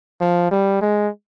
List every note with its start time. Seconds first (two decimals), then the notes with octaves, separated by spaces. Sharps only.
0.21 F3
0.51 G3
0.81 G#3